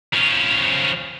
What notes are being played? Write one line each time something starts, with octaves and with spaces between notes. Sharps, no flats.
F3 C#4